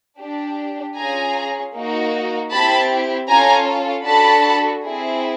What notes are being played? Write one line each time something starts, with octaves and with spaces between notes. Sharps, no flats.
D4 G4
C#4 F4 G#4 G#5 A#5
A#3 D#4 F#4
C4 E4 G4 A5 B5
C#4 F4 A4 G#5 A#5
D4 F#4 A4 A5 B5
C4 E4 G#4